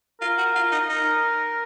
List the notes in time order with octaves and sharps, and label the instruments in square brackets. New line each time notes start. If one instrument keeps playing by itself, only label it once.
[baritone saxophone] F4 [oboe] A#4
[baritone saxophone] F#4
F4
D#4
[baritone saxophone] D#4 [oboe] A#4